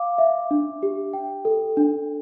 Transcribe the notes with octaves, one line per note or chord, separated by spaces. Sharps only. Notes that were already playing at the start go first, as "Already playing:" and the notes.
Already playing: F5 D6
E5
D4
G4
G5
A4
D4